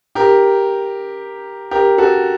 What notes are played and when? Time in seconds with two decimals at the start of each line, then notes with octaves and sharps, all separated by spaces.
0.15 G4 A#4
1.71 G4 A#4
1.98 F#4 A4